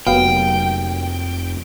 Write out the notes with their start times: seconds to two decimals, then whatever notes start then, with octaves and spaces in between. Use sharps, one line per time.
0.07 F1 F#3 A#3 B3 F5 G5